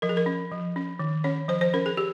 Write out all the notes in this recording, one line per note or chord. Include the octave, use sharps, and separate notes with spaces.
F3 A#4
G#4
A#4
C#4
F3
C#4
D#3
C#4 C#5
F3 C5
C5
C#4 A#4
G#4
G4